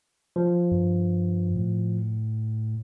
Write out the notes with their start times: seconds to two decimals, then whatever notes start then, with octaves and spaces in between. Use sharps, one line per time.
0.36 F3
0.71 G2
1.55 A2